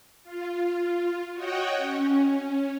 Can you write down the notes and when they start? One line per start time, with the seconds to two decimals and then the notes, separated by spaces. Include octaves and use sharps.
0.23 F4
1.34 F#4 C#5 D#5 F#5 G5
1.77 C#4